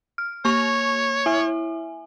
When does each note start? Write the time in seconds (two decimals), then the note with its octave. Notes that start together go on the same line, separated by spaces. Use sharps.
0.18 F6
0.45 A#3 C#5 C#6 F7
1.26 E4 E5 G#5